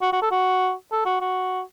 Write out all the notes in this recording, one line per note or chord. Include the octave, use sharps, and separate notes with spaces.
F#4
F#4
A4
F#4
A4
F#4
F#4